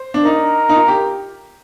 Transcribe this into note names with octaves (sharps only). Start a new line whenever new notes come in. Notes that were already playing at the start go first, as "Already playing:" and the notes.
Already playing: C5
D4
D#4 A#4
D#4
F4
G4